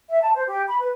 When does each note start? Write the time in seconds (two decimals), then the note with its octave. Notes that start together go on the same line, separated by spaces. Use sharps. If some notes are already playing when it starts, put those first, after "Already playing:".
0.09 E5
0.21 A5
0.35 C5
0.47 G4
0.68 B5
0.80 B4